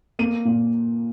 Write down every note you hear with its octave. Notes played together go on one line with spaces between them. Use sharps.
A#3 D#7
A#2